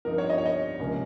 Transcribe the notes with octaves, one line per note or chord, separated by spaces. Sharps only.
G2 F3 C4 D#4 A#4
C#5
D#5
C#5
D#5
C#2 C3 F3 A#3 C#4